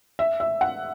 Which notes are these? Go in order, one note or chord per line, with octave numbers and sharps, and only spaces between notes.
E5
E5
F#5